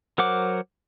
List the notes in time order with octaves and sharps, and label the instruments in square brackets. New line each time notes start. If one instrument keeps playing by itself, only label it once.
[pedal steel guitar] F#3 A#4 C5 F#5 D6